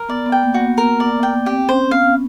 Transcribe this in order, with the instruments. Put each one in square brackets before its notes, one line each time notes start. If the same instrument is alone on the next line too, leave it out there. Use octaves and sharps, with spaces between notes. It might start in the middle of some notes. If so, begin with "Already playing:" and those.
Already playing: [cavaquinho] A#4
[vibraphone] B3 [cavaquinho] D5
[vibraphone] B3
[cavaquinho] G5
[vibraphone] A#3
[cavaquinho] F#4
[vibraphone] B3
[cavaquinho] A#4
D5
G5
[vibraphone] C4 [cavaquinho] G4
[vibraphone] C#4 [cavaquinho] C5
[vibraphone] B3 [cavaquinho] F5